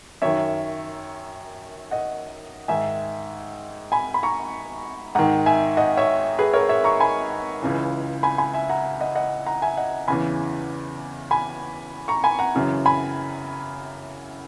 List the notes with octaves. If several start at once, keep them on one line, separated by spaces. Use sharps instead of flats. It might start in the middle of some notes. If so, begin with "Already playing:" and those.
F#2 D#3 C#5 E5
D#5 F#5
G#2 D#3 E5 G#5
G#5 B5
B5
A#5 C#6
G#2 D#3 F#5 A#5
E5 G#5
D#5 F#5
C#5 E5
G#4 B4
A#4 C#5
C#5 E5
A#5 C#6
G#5 B5
C#2 C#3 E3
G#5 B5
G#5 B5
E5 G#5
F#5 A#5
D#5 F#5
D#5 F#5
F#5 A#5
E5 G#5
D#5 F#5
E2 C#3 E3 G#5 B5
G#5 B5
A#5 C#6
G#5 B5
F#5 A#5
F#2 C#3 E3
G#5 B5